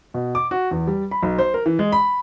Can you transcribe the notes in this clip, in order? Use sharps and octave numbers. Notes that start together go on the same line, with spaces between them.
B2
D6
F#4
E2
G3
B5
B1
C5
A#4
E3
G#3
B5